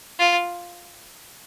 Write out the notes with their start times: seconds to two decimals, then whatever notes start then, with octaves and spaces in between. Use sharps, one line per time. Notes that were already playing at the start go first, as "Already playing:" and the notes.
0.19 F4